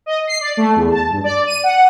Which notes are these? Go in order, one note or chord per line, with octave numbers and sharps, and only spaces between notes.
D#5
C7
D5
A3
E2
A5
G2
D5
D#7
F#5